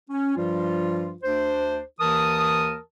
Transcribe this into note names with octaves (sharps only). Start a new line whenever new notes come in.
C#4
G2 F3 G3 F4
D2 D4 C5
D#2 E3 A#4 A5 D#6